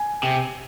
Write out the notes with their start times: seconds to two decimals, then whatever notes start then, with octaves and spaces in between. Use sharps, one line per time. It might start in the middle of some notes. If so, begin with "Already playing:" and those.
Already playing: G#5
0.23 C3